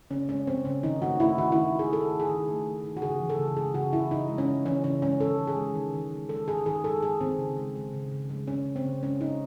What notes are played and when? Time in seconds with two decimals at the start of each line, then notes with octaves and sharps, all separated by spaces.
0.10 C#3 C#4
0.29 G#3 C#4
0.47 G#3 C4
0.65 C#3 C#4
0.83 D#3 D#4
1.02 A3 F#4
1.20 A3 E4
1.38 D#3 F#4
1.52 D#3 E4
1.74 A3 G#4
1.92 A3 A4
2.11 D#3
2.20 G#4
2.29 D#3
2.48 A3
2.66 A3
2.84 D#3
2.97 F#4
3.02 C#3 G#4
3.20 E3
3.30 A4
3.38 C#3
3.57 G#3 G#4
3.74 C#3 F#4
3.93 E3 E4
4.11 C#3 D#4
4.29 G#3
4.38 C#4
4.47 C#3
4.66 E3 C#4
4.84 C#3 C#4
5.02 G#3 C#4
5.20 D#3 A4
5.39 G#3
5.47 G#4
5.56 G#3
5.75 D#3
5.93 D#3
6.12 G#3
6.29 G#3 A4
6.47 D#3 G#4
6.66 D#3 G#4
6.84 G#3 A4
7.02 G#3 G#4
7.21 D#3 C4
7.39 C#3
7.57 G#3
7.75 G#3
7.93 C#3
8.12 C#3
8.30 G#3
8.47 G#3 C#4
8.66 C#3
8.76 C4
8.85 C#3
9.03 G#3 C#4
9.20 G#3 D#4